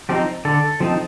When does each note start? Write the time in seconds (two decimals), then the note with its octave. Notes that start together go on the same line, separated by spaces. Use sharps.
0.09 F3 C4 D#4 G4
0.45 D3 A4
0.80 F3 C4 D#4